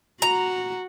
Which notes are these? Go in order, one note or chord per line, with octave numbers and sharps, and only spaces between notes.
F#4 A#5